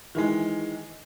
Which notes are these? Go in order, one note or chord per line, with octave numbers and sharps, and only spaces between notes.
D#3 E3 G#3